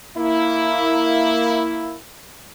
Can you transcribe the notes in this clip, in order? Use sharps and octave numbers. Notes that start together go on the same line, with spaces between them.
A#3 E4